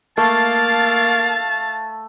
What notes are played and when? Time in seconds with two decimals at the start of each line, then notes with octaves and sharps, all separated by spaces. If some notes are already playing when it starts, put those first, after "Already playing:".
0.18 A3 A#3 F5 A5 A6